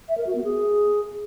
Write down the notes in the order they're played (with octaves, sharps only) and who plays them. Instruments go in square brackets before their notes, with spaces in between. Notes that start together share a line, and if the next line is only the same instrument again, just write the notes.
[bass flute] E5
A#4
F#4
B3
G#4